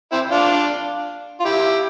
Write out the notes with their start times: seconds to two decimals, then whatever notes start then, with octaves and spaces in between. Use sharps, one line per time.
0.12 C4 E4
0.31 D4 F4
1.40 F4
1.45 E4 G4